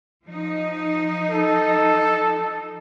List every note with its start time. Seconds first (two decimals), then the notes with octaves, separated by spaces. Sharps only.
0.24 F3 D#4
1.29 A4